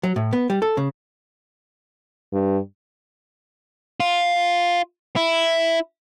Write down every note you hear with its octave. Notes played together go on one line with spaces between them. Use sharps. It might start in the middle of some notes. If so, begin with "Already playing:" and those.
F#3
A2
B3
G3
A4
C#3
G2
F4
E4